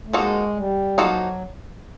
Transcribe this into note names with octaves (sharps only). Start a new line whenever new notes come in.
A3
F3 G#3 A#3 D#4 F#4 A4
G3
F3 F#3 A#3 D#4 F#4 A4